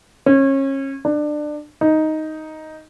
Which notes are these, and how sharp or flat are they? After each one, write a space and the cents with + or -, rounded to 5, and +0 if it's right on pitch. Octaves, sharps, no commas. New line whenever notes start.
C#4 -30
D4 +25
D#4 +5